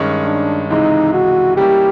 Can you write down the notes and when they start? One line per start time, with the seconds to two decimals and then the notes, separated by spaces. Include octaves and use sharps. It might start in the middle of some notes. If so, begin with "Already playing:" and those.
Already playing: G2 D#3 G#3 C#4
0.26 D4
0.70 C#2 C3 E3 G#3 D#4
1.13 F#4
1.57 G3 A#3 C#4 E4 G4